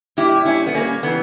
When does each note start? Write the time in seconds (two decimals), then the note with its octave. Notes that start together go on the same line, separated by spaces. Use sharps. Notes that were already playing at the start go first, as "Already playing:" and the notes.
0.17 A#2 G3 E4 G4
0.45 A#2 G3 C#4 E4
0.67 B3
0.74 A#2 G3 A#3 C#4
1.03 C#3 E3 G3 B3